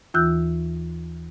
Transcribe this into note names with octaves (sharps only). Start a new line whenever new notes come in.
D#2 E3 F4 E6 F#6 G6